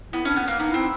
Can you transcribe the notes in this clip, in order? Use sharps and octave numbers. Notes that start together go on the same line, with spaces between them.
B3 E4
C#4 D4
B3
A#3
B3 D#4
C4 E4